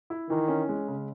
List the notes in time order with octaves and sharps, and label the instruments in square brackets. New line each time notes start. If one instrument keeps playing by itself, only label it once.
[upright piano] E4
[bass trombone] D#3 [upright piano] E3
[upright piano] C#4
G#3
C#3